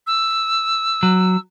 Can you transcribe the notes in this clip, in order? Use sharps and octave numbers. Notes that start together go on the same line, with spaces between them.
E6
F#3